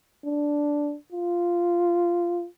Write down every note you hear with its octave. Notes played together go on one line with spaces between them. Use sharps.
D4
F4